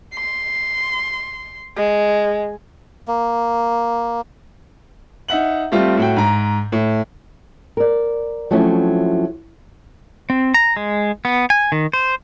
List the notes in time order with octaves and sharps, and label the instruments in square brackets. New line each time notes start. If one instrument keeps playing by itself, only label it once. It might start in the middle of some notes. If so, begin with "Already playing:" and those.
[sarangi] C6
G#3
[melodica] A#3
[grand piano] D#4 E5 F#5 F#7
G3 A3 C4 F4 G4
A2 F#4 G5
G#2 A#5
A2
[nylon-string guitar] A#4 D5
F3 F#3 A3 C4 C#4 E4
[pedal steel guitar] C4
A#5
G#3
B3
G#5
D#3
C5